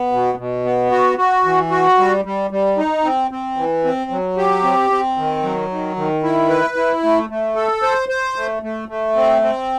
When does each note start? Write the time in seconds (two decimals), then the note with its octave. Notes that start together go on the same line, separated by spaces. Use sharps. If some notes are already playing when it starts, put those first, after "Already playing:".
Already playing: B3
0.12 B2
0.38 B2
0.65 B3
0.91 F#4
1.18 F#4
1.45 E3
1.71 F#4
1.98 G3
2.25 G3
2.51 G3
2.78 D#4
3.04 C4
3.31 C4
3.57 E3
3.84 C4
4.11 F#3
4.37 G4
4.63 C4
4.90 C4
5.17 D#3
5.43 F#3
5.70 D#3
5.96 D#3
6.23 E4
6.49 B4
6.76 E4
7.03 A3
7.30 A3
7.56 A4
7.82 C5
8.09 C5
8.36 A3
8.63 A3
8.89 A3
9.16 C4
9.42 C4